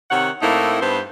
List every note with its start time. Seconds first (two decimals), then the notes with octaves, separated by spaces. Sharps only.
0.11 C3 D#3 C#5 F#5
0.42 A2 A3 A#3 C4 D#4 E4
0.81 G2 B3 C4 C5